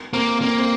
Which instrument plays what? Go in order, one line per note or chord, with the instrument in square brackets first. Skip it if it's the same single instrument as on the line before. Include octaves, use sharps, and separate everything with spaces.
[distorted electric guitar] A#3 [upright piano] C4
[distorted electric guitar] A#3 [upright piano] C4
[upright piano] C4